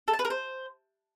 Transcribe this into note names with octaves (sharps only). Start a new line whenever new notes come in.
A4
A5
B4
A#4
C5